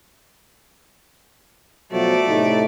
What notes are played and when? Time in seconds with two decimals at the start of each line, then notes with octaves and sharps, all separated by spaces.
1.92 B2 F3 F#3 A3 D5
2.28 A2 C3 D#4